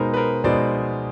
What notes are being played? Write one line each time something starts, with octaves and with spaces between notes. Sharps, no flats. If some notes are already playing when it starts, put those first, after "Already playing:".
Already playing: B2 G#3 B3 D#4 A#4 C5
B4
A#4 C5
B2 G#3 B3 D#4 C5 D5